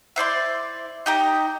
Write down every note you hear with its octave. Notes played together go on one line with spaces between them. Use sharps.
E4 C5 D5 C6
D#4 G4 A#5